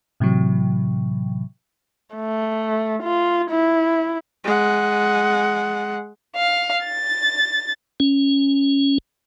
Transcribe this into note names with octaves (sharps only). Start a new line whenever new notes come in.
A2 C3 E3 F#3
A3
F4
E4
G#3 F#5
F5
A6
C#4